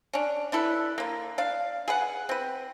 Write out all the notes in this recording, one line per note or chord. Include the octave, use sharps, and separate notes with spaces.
C#4 D4
D4 E4 A4 B4
D3 A#3
D4 F5
G#4 B4 F#5
C4 B4